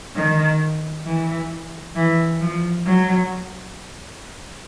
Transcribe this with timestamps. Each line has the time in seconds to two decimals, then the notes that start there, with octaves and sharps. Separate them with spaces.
0.16 D#3
1.06 E3
1.96 E3
2.41 F3
2.85 F#3